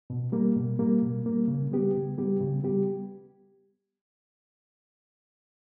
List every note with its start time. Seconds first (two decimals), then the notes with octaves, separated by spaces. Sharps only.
0.10 B2
0.32 G3 A#3
0.56 B2
0.79 G3 A#3
1.03 B2
1.25 G3 A#3
1.48 C#3
1.71 G3 B3 G4
1.95 C#3
2.18 G3 B3 G4
2.41 C#3
2.64 G3 B3 G4